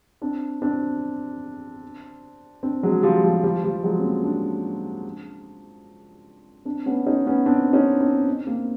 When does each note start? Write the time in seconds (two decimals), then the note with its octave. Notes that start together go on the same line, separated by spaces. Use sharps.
0.22 C4 D4
0.62 C4 D4
2.63 C4 D4
2.83 F#3 G#3
3.03 F3 G3
3.23 F3 G3
3.44 F3 G3
3.64 F3 G3
3.84 F#3 G#3
3.99 C#4
4.04 A#3 C4
4.24 C4 D4
6.65 C4 D4
6.86 B3 C#4
7.06 C#4 D#4
7.26 B3 C#4
7.46 C4 D4
7.73 C#4 D#4
8.00 C4 D4
8.47 A#3 C4